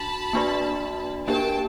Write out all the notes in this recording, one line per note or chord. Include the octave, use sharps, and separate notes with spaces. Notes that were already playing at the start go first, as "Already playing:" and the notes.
Already playing: D4 F#4 A5 B5
A#3 D4 F#4 B4 D5
A#3 D4 G4 A#4 G5 A5